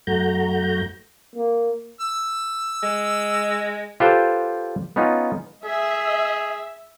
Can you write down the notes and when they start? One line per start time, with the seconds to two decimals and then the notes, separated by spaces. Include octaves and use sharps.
0.07 F#2 A3 F#4 A#5 G6
1.36 A#3
2.01 E6
2.83 G#3
4.00 F4 G4 A4 B4 C5 F5
4.96 B3 C#4 D#4 F4
5.65 G#4 E5